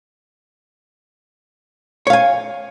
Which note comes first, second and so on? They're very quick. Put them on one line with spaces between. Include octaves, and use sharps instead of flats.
C#5 F5 G#5